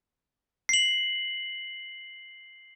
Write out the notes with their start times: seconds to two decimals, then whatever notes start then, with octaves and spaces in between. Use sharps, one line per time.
0.69 C7 F#7